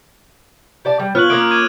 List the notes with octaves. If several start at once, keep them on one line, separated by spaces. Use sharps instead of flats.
G4 D5 A5
G3
B3 F4 C#5 F6 F#6 F#7
A#3 C#4 A#4 D6 D#6 D7
D6 G#6 D#7